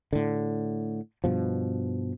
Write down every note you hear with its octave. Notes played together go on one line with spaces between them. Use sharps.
A2 D3
G2 B2 F3